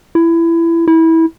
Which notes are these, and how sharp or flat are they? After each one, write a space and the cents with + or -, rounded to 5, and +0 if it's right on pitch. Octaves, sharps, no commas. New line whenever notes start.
E4 +20
E4 -20